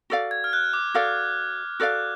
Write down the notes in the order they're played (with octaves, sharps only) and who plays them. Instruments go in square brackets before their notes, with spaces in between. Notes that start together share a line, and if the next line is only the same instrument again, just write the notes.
[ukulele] F#4 A4 D5 F5
[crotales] G#6
F6
F#6
D6
[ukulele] F#4 A4 D5 F5 [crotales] F6
[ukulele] F#4 A4 D5 F5 [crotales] F#6